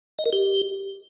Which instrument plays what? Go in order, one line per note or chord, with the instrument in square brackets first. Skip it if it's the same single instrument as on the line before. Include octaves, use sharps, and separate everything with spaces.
[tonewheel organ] D#5
A#4
G4